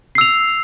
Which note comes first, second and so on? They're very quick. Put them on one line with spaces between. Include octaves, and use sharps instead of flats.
C7 E6 F7